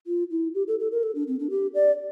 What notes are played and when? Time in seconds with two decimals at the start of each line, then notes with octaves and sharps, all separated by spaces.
0.07 F4
0.31 E4
0.55 G4
0.68 A4
0.80 A4
0.92 A#4
1.03 A4
1.15 D4
1.28 C4
1.40 D4
1.50 G4
1.74 D5